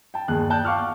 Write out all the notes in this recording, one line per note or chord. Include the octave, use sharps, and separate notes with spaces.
G5 A5
G1 D#2 G#4 F#6
D5 G5 A5 F#6 G6
F5 F#5 C#6 D6 F6 F#6